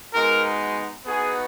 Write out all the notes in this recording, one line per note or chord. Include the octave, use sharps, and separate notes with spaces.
G#3 B3 D#4 F#4 A#4
B3 D#4 F#4 G#4